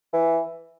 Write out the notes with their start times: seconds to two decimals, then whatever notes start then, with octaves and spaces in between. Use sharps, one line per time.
0.13 E3